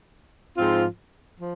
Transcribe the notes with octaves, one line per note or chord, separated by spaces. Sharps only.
G#2 F3 C4 F4
F3